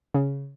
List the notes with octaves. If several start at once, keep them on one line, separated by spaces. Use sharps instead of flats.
C#3